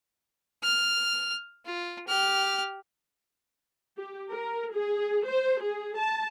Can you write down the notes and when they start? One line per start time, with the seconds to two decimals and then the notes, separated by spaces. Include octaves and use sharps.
0.63 F6
1.66 F4
2.07 G4 F6
3.97 G4
4.32 A#4
4.73 G#4
5.27 C5
5.62 G#4
5.99 A5